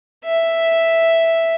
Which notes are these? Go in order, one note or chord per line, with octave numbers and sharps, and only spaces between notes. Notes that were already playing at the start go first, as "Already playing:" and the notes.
E5